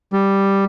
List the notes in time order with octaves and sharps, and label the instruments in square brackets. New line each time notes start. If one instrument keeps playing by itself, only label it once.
[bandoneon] G3